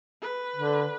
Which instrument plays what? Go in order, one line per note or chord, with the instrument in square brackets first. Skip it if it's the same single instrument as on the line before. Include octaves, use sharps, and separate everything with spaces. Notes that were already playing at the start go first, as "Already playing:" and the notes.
[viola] B4
[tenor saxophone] D3